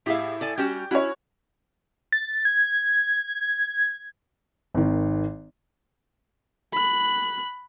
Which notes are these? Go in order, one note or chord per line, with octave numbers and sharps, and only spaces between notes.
A2 E4 G4 G#4 F5
A4 D5 G#5
G3 C#4 F#4 G4
C#4 E4 F#4 C#5
A6
G#6
G#1 D#3
B5 F#6